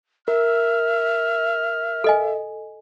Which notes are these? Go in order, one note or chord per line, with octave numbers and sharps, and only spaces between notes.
A#4 E5 F6
A4 D#5 G#5